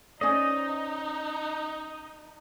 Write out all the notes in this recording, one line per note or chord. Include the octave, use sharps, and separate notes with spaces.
C#4 D#4 C5 D5 D#5